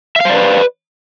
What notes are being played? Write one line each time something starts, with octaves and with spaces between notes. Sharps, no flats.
B4 C5 D5 E5 F5